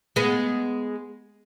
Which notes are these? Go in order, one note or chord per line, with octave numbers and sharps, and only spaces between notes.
G#3 B3